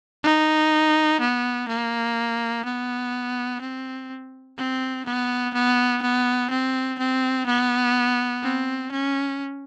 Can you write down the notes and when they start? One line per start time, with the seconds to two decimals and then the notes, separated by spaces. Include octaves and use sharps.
0.23 D#4
1.20 B3
1.68 A#3
2.65 B3
3.61 C4
4.58 C4
5.06 B3
5.54 B3
6.02 B3
6.50 C4
6.98 C4
7.47 B3
8.43 C4
8.91 C#4